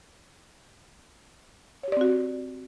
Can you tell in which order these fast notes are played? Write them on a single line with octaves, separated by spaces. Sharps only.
C#5 G4 D5 C4 F#4